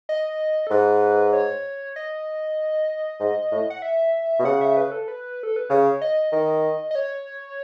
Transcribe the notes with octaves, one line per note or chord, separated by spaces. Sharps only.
D#5
A4
G#2 B4
C#5
D#5
G#2
A2
F#5
E5
B2
C#3 F#5
E5
B4
A4
B4
A4
B4
C#3 C#5
D#5
D#3 D#5
D#5
C#5